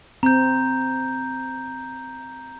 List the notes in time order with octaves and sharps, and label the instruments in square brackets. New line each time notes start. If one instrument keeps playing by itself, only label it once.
[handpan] C4 [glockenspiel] A#5 G6